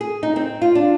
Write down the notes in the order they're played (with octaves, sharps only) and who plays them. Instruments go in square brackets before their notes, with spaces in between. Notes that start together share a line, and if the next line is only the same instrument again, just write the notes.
[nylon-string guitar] G#4
D#4
C4
F4
D4